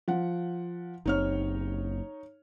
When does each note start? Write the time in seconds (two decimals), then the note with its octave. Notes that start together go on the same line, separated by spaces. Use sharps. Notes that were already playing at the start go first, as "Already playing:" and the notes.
0.08 F3 F#5
1.06 F#1 C4 D#4 C#5 F6